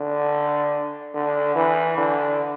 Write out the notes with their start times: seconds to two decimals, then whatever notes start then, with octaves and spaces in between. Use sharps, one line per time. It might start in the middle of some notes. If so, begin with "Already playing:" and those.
Already playing: D3
1.14 D3
1.55 E3
1.97 D3